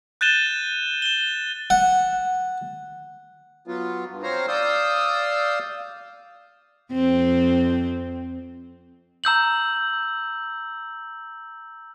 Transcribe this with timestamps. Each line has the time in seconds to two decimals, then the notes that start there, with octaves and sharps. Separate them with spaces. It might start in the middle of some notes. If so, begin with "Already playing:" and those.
0.21 F#6 G6 A6 D#7 E7 G7
1.02 E7 G7
1.70 F#5
3.68 F#3 B3 F4
4.08 G2
4.23 C4 C5 C#5 F5 A#5
4.48 D5 F5 D#6 E6 G6
6.92 F2 C4
9.24 A#5 E6 G6 F#7